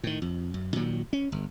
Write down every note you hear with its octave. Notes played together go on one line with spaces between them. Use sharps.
A2 D#3
F2
F#2
A#2 D#3 F#3
C#4
G1